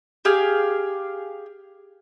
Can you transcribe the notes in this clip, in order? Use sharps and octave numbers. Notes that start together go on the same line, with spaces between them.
G4 G#4 F5